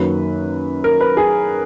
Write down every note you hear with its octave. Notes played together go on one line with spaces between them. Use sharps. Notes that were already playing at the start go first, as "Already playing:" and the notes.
Already playing: F#2 D#3 F#3 A#3 B4
A#4
B4
G#4